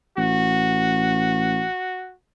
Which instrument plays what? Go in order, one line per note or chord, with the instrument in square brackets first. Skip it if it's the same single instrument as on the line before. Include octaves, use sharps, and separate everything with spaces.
[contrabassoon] A1 [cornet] F#4